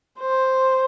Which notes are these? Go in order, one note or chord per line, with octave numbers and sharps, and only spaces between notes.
C5